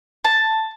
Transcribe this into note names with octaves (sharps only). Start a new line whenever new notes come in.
A5